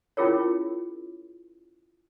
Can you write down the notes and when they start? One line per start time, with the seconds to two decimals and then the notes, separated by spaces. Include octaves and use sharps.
0.17 C#4 E4 F4 G#4 A#4 C#5